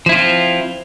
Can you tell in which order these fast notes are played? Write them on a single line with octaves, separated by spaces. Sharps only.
F3 E4 F4 C4